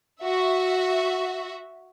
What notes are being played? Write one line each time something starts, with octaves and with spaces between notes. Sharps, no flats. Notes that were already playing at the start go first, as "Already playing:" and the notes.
F#4 E5